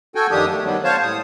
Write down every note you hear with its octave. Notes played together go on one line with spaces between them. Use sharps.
F#4 A4 G5 G#5
F#2 D#3 F3 D4 G4 D#6
A3
D#3 F#3 G3 B3
C5 C#5 F5 A5
A2 G3 D#6